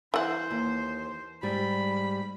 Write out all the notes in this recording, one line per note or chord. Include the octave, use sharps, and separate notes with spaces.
E3 C5 F#5
D#2
G#2 G3 B5